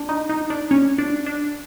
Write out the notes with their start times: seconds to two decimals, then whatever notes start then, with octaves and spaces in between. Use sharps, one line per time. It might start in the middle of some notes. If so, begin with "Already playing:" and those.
Already playing: D4
0.09 D#4
0.30 D#4
0.50 D4
0.71 C#4
0.98 D4
1.26 D4